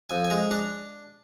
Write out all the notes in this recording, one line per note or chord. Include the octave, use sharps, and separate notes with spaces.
F2 G#5
G#5
G#3 A#5
D4 A#5